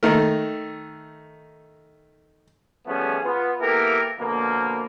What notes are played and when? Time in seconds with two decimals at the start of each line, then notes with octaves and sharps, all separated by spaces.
0.03 D#3 A3 A#4
2.87 F3 G3 A3 B3 C#4 G#4
3.24 B3 F4
3.60 A#3 B3 E4 G4 A4 A#4
4.19 B2 D3 F3 A#3